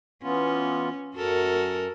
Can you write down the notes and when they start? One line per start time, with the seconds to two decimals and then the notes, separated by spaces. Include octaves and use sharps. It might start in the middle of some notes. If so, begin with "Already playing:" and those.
0.23 E3 B3 C#4 F4
1.15 F#2 F#4 A4 A#4